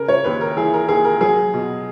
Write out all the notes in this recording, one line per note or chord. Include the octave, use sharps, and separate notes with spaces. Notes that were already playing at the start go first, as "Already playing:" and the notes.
Already playing: C#3 A#4
C#5
D#2 B4
A#4
E3 G#4
A#4
D#2 G#4
A#4
F#3 G#4
B2